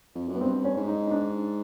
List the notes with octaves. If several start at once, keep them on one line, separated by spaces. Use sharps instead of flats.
F2
F#2
B3
G2 C4
C#4
G#2
D#4
D#4
D4